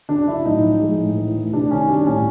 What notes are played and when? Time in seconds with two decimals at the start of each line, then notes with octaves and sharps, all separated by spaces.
0.09 C#3 D4
0.27 F#3 E4
0.45 A2 D#4
0.62 F3
0.82 G#3
0.98 A2
1.18 E3
1.35 A3
1.53 C3 D4
1.70 D#3 C#4
1.88 G3 D4
2.07 A2 C#4